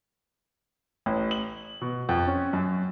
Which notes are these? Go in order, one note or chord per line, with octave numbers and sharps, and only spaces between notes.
A1
F#7
B2
F2
C#4
F#2